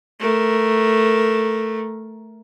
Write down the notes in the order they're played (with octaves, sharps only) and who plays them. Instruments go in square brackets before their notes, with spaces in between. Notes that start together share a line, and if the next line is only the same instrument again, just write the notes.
[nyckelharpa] A3 A#4